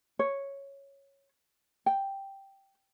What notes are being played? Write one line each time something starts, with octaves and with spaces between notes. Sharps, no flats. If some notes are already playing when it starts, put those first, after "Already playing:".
C#5
G5